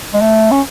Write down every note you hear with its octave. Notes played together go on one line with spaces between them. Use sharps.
G#3
A3
C#4